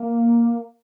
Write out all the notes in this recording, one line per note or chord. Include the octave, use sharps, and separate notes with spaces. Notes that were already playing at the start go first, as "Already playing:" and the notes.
Already playing: A#3